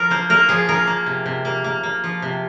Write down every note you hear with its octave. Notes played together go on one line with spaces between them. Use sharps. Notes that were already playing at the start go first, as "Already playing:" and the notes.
Already playing: F3 A#4
A#3 C5
A#3 A#4
F3 G#4
F3 A#4
A#3
C3
C3
A#3
A#3
A#3
F3
C3